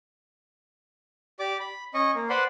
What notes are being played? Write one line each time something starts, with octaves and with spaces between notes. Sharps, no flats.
G4 D5 D6
B5
C#4 D#5 C#6
A#3
B4 C5 D5 F#5 B5 C6